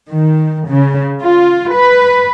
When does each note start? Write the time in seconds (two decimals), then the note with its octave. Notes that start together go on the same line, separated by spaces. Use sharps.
0.11 D#3
0.70 C#3
1.21 F4
1.73 B4